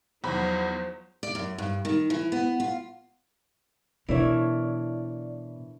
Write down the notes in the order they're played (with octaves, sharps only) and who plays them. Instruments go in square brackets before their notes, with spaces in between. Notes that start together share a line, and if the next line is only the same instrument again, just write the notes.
[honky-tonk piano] E2 B5 [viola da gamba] F3 F#3 D#4 [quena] C5
[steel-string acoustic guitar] D5
F#2
G2
D#3
E3
B3
F4
[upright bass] B2 [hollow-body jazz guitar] E3 E4 [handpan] D4 A#4 C#5 [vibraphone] D5